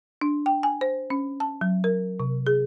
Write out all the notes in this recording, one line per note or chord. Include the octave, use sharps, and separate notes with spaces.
D4
G5
G#5
C5
C#4
A5
F#3
A#4
C3
G#4